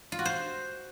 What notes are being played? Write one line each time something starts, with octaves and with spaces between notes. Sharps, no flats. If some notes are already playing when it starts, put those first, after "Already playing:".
F4
F#4
C5